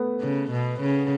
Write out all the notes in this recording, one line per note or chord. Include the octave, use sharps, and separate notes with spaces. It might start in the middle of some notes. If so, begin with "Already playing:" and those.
Already playing: A3 B3
C#3
B2
C#3